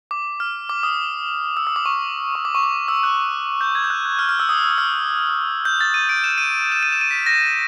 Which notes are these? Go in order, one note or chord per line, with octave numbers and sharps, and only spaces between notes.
D6
F6
D6
D#6
E6
D#6
D6
C#6
C#6
D6
C#6
D6
E6
F#6
G6
G#6
G6
F#6
F#6
F6
F6
E6
D#6
E6
F6
G6
A6
D#7
D7
E7
D#7
E7
D#7
E7
D#7
B6
A#6